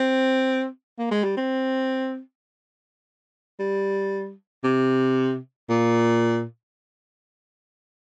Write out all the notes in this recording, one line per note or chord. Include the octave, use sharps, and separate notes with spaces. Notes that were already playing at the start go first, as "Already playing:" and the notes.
Already playing: C4
A#3
G#3
G3
C4
G3
C3
A#2